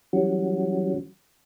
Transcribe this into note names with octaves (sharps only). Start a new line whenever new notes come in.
E3 F#3 G3 C#4 F#4